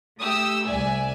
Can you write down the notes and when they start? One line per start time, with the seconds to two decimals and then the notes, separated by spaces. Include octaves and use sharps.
0.19 A3 G4 D#6 E6
0.65 C2 D5 E5 G#5